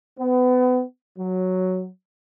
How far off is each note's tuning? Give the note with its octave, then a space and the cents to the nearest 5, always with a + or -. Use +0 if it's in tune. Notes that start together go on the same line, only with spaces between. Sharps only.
B3 +30
F#3 +0